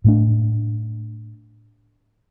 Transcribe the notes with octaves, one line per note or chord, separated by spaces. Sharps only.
A2 A3 D4